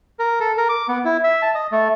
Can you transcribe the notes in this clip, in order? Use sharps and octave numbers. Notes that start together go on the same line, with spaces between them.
A#4
A4
A#4
D6
B3
E4
E5
A5
D#5
A3